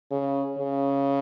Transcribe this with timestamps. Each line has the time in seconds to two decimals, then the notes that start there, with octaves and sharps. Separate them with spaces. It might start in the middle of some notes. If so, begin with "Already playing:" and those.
0.11 C#3
0.58 C#3